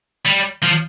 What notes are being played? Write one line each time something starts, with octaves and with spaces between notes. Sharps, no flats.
G3
F3